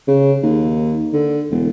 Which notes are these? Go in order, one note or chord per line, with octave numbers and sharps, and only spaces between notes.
C#3
D#2
D3
E1